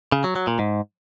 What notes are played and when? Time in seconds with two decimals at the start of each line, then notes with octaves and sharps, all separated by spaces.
0.12 C#3
0.24 F#3
0.36 F#3
0.47 A#2
0.59 G#2